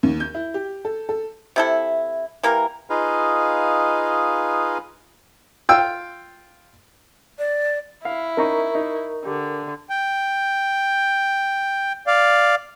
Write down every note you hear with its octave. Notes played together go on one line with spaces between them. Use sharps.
D#2
G6
E4
G4
A4
A4
C3 E4 A4
E3 A#3 G4 A#4
D#4 F4 G#4 B4 D#5 F5
F4 G5 E6
D5
E4 F5
C#4 D#4 A#4 A#5 C#6
D#4
D3 G4
G5
D5 F5